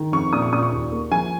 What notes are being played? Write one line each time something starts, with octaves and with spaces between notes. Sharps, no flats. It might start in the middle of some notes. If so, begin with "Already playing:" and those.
Already playing: D#3
F2 C#6
A#2 D#6
C#6
A#2 D#6
C#6
D#2
A#3
F3 G#5